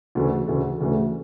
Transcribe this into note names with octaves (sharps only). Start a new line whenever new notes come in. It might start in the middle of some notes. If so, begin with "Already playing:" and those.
D2 C#3 E3 A3
D2 C#3 E3 A3
D2 C#3 E3 A3